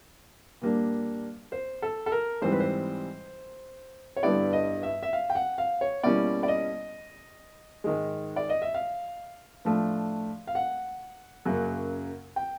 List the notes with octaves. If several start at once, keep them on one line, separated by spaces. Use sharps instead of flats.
A#2 G3 A#3 D4
C5
A4
A4
A#4
G#2 E3 G3 C4 C5
B4
C5
C#5
G2 D3 G3 B3 E4 D5
D#5
E5
E5
F5
G5
F#5
F5
C#5
B2 G3 A#3 C#4 E4 D5
D5
D#5
G#2 D#3 G#3
D5
D#5
E5
F5
A2 F3 A3 D4
F5
F#5
F#2 C#3 F#3 A#3
G5